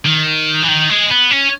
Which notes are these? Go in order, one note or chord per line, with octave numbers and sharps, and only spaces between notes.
D#3
E3
D#3
G#3
B3
C#4